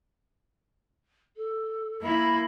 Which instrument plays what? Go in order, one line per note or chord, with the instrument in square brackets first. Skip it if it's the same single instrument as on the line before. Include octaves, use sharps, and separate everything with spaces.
[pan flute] A4
[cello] A#3 E4 [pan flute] B5